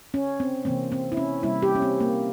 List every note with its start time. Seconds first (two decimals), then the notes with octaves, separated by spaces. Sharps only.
0.14 C#4
0.40 C4
0.65 C3 E3 A#3 C4
0.92 C4
1.12 E4
1.17 C#4
1.43 C3 G3 A#3 E4
1.63 G4
1.75 C#4
1.82 C4
2.00 A#3